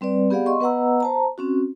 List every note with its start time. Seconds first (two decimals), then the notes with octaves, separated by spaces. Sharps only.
0.01 G3 C4 B4 D5
0.30 B3 G4 G#4 D5 F5 F#5
0.46 D#5 C6 C#6
0.60 B3 B4 D#5 F#5 A#5 E6
1.00 C5 A5 A#5
1.38 C4 C#4 F#4